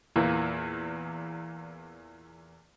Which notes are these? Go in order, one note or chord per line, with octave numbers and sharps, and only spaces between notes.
E2 A#2 E3